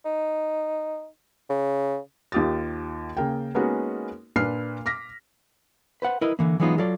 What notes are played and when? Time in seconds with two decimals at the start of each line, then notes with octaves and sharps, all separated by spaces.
0.05 D#4
1.50 C#3
2.32 D#2 F4 G4 D#6 A6
3.17 C#3 A#3 G5
3.55 G#3 A#3 B3 C#4 D#4 F#4
4.36 A#2 D4 B4 F6 C7
4.86 D6 F6 A#6 B6
6.02 B4 C5 F#5
6.21 E4 A#4 B4 D#5
6.39 D3 E3 A#3
6.60 E3 F#3 G#3 B3 D#4 F4
6.78 F#3 F4 A4 D5